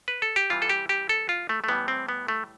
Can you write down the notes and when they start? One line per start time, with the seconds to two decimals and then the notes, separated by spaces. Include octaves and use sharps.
0.08 B4
0.22 A4
0.36 G4
0.50 C3 E3 G3 F4
0.62 A4
0.69 G4
0.89 G4
1.09 A4
1.29 F4
1.49 A3
1.64 A3
1.68 A2 E3 G3 B3
1.88 C4
2.09 B3
2.28 A3